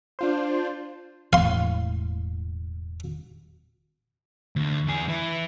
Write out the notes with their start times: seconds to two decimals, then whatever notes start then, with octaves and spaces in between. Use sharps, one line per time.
0.19 D4 F4 C5
1.33 E1 A2 F5 C6
4.56 D2
4.87 E2 G#4
5.08 E3 E4